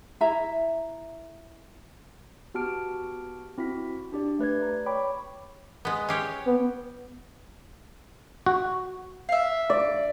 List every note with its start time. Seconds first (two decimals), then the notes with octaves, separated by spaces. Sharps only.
0.21 E4 E5 A#5
2.54 B3 F#4 G4 A5 F6 D7
3.58 C4 E4 F#4 B6
4.12 D4 G4 D5
4.39 A3 B4 D5 G#6
4.59 A3 A#5
4.86 C#5 G5 B5 C#6 D6
5.85 G#3 B3
6.09 C#4 G4 C#5
6.46 B3
8.46 F#4
9.29 E5 F5
9.70 D5